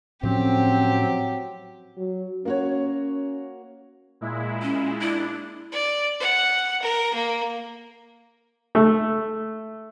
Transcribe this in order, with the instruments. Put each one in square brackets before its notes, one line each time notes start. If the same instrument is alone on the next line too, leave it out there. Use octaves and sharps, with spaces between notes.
[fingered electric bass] A2 F3 C#4 [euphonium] F#3 [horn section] C4 [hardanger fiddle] G4
[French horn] F#3
[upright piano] A#3 F#4 C#5 [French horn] C#4
[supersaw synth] A#2 G#3 E4
[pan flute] C#4
[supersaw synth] D4 [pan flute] E4
[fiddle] D5
F#5
A#4
A#3
[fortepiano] A3